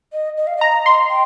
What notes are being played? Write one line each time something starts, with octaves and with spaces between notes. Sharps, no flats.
D#5
D#5
F5
D#5 A#5
C6
G5